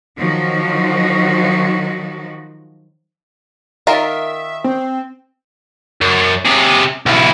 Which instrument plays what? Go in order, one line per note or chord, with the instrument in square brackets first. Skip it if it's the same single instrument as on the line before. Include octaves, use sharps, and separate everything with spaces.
[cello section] D#3 F3 F#3 F#4
[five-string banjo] D#3 F4 A#4 [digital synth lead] E5
[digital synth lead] C4
[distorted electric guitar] F#2
C3 G#4
B1 E4